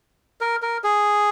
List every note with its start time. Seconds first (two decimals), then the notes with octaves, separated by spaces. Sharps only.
0.41 A#4
0.62 A#4
0.84 G#4